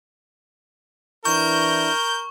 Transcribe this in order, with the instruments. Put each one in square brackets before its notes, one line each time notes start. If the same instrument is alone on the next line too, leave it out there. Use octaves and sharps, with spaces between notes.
[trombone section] E3 D4 E4 [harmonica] A#4 [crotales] C#6 [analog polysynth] G6